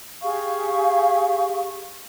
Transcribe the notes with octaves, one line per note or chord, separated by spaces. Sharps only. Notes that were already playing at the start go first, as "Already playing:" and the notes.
G4 G#4 F5 C#6